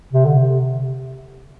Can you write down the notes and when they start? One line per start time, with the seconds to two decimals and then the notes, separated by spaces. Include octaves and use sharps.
0.13 C3
0.25 D3
0.36 C3